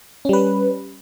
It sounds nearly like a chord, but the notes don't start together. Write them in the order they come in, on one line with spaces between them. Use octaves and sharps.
C#4 G3 B4